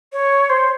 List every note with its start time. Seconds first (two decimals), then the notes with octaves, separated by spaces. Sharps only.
0.13 C#5
0.49 C5